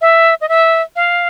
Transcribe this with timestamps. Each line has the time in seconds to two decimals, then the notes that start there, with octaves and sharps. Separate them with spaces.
0.01 E5
0.41 D#5
0.49 E5
0.96 F5